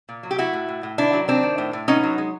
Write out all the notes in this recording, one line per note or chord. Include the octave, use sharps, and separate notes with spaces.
A#2
F#3
G4
A3 E4 F#4
A2
A2
A2
D#3 D4 E4
F#3
D#3 C4 D4
D#3
A2
A2
B3 C#4 D#4
F#3
G#3